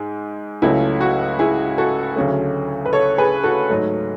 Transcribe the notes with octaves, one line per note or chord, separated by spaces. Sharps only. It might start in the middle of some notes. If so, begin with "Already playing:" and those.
Already playing: G#2 G#3 G#4
C#2 C#3 F#3 A3 E4 G#4
F#4
E4 G#4
F#4 A4
D2 C#3 F#3 A3
B4
A4 C#5
G#4 B4
F#4 A4
G#2 F#3 A3